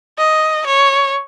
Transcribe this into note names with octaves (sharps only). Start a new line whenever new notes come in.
D#5
C#5